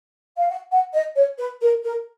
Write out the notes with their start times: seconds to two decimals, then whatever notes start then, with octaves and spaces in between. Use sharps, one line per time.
0.37 F5
0.49 F#5
0.72 F#5
0.94 D#5
1.17 C#5
1.38 B4
1.61 A#4
1.84 A#4